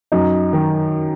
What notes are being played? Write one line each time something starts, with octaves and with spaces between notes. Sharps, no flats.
F#2 D#4
D#3